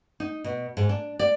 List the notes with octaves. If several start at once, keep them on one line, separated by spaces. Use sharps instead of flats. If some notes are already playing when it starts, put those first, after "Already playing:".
D#4
B2
G#2
D4
D5